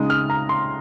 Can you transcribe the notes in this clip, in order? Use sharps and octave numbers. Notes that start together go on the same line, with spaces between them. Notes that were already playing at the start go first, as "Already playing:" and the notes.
Already playing: C#3 G#3 D#4 D#6
F6
A#5
C6